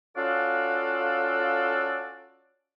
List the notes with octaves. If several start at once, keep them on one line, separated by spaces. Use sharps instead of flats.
C#4 F4 F#4 A4 D5 F5